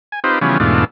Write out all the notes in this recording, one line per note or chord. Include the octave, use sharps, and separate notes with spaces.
G#5
C4 D#4 F4 G4 B4 C5
C#3 E3 F3 G3 B3 C#4
E2 G#2 B2 A3 D4 F4